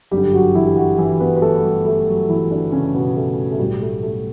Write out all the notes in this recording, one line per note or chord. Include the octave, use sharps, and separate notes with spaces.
G1 F#2 D3 G3 G4
F#3 F#4
E3 E4
G4
F#3 F#4
E3 E4
B3 B4
B4
A3 A4
G3 G4
A3 A4
F#3 F#4
E3 E4
D3 D4
C#3 C#4
B2 B3
A3
A3
B1 A2 F#3 G3
A3
A3